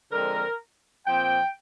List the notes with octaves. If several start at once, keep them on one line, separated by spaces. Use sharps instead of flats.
D3 F3 G#3 C4 A#4
A#2 F3 C4 G5